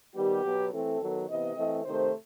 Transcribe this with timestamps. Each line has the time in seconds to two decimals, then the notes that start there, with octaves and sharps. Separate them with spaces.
0.15 D#3 G3 B3 G4
0.43 B2 F#3 B3
0.71 E3 A3 C4 A4
0.99 D#3 F#3 B3
1.27 C3 E3 B3 D#5
1.56 E3 A3 C4
1.84 C3 D#3 A3 C5